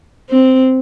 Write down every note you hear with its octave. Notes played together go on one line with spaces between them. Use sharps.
C4